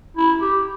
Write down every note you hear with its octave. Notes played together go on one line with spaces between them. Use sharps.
E4
G4